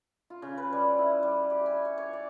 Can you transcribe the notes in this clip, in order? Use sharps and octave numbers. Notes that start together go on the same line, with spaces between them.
F4
C#3
B4
G3
E4
G3
G4
G#5
C#5
C#5
D5